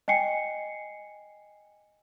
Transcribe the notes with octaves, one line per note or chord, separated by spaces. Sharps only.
D#5 G5 G#5 C7 C#7